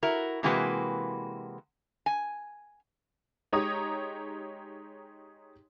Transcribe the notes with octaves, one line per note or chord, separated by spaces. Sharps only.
E4 F#4 A#4
C3 E3 G#3 A#3 F#4 B4
G#5
G#3 D#4 G4 C#5 A#5 D#6